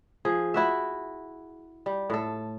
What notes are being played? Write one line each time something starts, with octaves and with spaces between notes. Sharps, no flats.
F3 G#4
E4 F#4 E5
G3
A2 A4